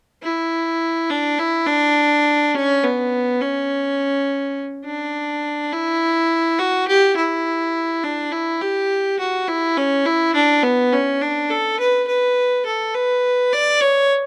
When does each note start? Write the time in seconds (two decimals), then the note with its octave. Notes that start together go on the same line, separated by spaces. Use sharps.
0.23 E4
1.09 D4
1.39 E4
1.67 D4
2.54 C#4
2.84 B3
3.41 C#4
4.86 D4
5.72 E4
6.59 F#4
6.88 G4
7.16 E4
8.03 D4
8.32 E4
8.61 G4
9.19 F#4
9.48 E4
9.77 C#4
10.06 E4
10.34 D4
10.63 B3
10.92 C#4
11.21 D4
11.50 A4
11.79 B4
12.07 B4
12.66 A4
12.94 B4
13.52 D5
13.80 C#5